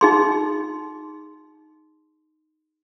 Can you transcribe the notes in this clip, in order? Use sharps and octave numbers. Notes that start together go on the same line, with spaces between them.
D#4 G#4 C6